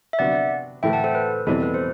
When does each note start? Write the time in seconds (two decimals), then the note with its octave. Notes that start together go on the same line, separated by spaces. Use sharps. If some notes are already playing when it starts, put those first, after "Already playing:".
0.13 E5
0.19 C3 F#3 B3 D4 F#4 D5 F#5
0.83 A2 E3 A3 E5 G5
0.93 F#5 A5
1.04 A4 C5
1.15 B4
1.46 E2 B2 G3 C4 E4 A4
1.63 B4
1.74 C5